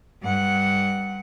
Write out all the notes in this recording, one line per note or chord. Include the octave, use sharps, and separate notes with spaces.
G2 F#5